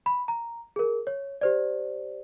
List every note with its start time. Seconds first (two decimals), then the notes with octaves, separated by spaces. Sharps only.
0.06 B5
0.28 A#5
0.76 G#4 A#4
1.07 C#5
1.41 G4 C5 D5